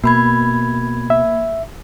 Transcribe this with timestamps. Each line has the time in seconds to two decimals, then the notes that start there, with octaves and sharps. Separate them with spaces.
0.04 B2 A#3 B5 G#6
1.10 E5